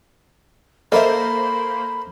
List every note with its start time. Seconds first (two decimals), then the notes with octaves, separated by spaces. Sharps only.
0.92 A#3 A4 A#4 C5 D#5 E5 B5